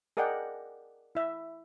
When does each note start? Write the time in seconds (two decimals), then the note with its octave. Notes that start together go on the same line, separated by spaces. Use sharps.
0.17 G#4 A#4 D5 D#5 F#5 G5
1.15 E4 E5